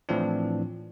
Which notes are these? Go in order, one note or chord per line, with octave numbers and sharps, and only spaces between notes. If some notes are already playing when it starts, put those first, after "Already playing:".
A2 E3 F3 C4 D4